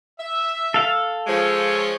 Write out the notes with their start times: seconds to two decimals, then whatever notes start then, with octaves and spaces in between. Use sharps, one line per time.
0.19 E5
0.74 A4 F5
1.27 F3 G#3 C#5